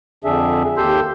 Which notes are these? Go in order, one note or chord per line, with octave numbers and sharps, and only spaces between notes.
F2 D3 D4 G#4 E5
D#2 G4 A4 C6 E6 G6